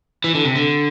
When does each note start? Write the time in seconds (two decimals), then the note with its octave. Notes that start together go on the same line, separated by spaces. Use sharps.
0.24 E3
0.35 D3
0.45 C3
0.55 D3